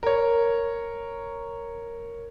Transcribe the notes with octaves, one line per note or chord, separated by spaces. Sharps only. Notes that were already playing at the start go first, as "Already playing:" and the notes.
A#4 C#5